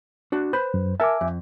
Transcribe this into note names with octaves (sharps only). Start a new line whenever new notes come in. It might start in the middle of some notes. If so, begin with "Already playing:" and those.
D4 F#4
B4 C5 B5
F#2
A#4 E5 G#5 A5 D6
F2